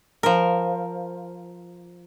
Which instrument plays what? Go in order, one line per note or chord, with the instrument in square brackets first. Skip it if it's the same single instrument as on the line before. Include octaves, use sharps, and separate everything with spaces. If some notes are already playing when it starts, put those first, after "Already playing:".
[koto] F3 A#4